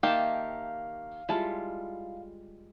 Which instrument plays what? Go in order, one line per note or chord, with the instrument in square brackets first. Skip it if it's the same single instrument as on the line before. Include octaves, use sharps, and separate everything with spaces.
[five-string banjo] D#3 A#3 G4 [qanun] E5 A5 [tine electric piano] F5
[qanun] G3 G#3 F4 [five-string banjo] E4 A5